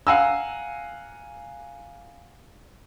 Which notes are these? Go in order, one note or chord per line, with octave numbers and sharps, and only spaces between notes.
F5 F#5 G#5 A#5 E6